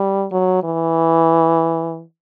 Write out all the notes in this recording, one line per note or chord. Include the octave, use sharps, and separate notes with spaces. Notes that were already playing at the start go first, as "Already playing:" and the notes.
Already playing: G3
F#3
E3